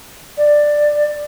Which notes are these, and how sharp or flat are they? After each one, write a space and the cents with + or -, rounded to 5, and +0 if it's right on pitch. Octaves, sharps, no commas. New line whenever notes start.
D5 +10